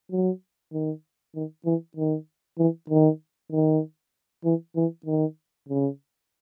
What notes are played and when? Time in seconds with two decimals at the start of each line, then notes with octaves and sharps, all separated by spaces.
0.11 F#3
0.72 D#3
1.35 D#3
1.66 E3
1.97 D#3
2.58 E3
2.90 D#3
3.52 D#3
4.44 E3
4.76 E3
5.06 D#3
5.69 C#3